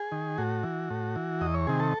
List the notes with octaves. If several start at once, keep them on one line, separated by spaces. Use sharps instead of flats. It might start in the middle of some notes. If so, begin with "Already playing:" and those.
Already playing: G#4
D#3
A2 F#4
E3
A2
E3
E2 D#5
C#5
C3 D#3 G#4
A4